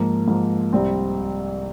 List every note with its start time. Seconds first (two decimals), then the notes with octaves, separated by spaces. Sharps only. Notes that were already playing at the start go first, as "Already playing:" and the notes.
Already playing: G#2 F3 A#3
0.28 G#2 F3 A#3
0.73 C2 C3 G3 C4